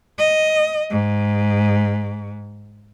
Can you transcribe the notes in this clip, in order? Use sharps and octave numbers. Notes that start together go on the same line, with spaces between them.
D#5
G#2